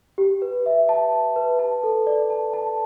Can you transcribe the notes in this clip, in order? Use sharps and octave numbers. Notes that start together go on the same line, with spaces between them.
G4
B4
E5
A5
A5
B4
A5
A4
D5
A5
A5